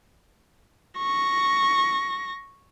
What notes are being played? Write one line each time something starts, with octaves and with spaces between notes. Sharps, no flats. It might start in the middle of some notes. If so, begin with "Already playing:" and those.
C#6 A#6